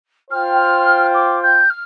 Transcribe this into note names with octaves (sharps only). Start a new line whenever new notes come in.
F4 C5 G5 F6
D6
G6
F6